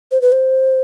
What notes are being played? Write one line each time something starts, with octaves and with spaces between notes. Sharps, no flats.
C5
B4
C5